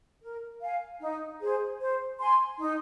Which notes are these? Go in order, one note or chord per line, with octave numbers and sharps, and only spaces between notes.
A#4
F5 G#5
D#4
G#4 C5
C5
G#5 C6
D#4